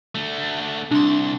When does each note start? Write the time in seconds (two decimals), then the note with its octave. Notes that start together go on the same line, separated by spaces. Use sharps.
0.15 D3 A3
0.91 C2 D4 C6